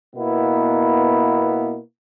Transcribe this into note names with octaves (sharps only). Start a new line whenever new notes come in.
B2 A#3 B3 E4